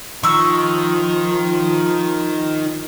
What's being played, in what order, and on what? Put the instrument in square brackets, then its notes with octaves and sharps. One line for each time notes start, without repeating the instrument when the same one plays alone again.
[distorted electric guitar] D#3 [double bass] F3 [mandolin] C#6 E6